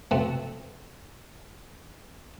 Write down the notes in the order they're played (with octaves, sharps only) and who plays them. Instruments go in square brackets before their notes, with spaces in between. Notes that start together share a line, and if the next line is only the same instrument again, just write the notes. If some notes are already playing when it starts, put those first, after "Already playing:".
[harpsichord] F3 A3 B3 C4 F#4